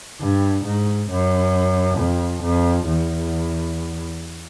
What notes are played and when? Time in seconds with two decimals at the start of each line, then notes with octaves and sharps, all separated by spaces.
0.20 G2
0.65 G#2
1.10 F#2
1.98 F2
2.43 F2
2.87 E2